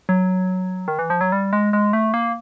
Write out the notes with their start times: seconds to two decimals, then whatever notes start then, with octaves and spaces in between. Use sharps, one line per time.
0.09 F#3
0.88 D#3
0.99 E3
1.10 F3
1.21 F#3
1.32 G3
1.53 G#3
1.73 G#3
1.93 A3
2.14 A#3